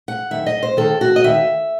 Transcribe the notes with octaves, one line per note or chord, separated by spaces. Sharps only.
F#5
F#2 D#3 E5
D#5
C5
D#2 D#3 A4
F#4
D#5
D#2 D#3 E5